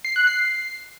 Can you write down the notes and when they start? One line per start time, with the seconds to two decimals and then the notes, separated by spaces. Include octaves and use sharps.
0.05 C7
0.16 F#6
0.27 C7